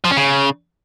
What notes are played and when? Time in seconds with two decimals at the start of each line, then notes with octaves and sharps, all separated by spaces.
0.04 F3
0.11 C#4
0.17 C#3